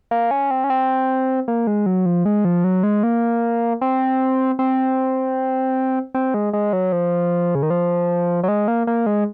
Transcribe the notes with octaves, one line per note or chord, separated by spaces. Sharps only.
A#3
C#4
C4
C#4
C4
A#3
G#3
F#3
F3
G#3
F3
F#3
G#3
A#3
C4
C4
C4
G#3
G#3
F#3
F3
C#3
D#3
F3
F#3
G#3
A#3
A#3
G#3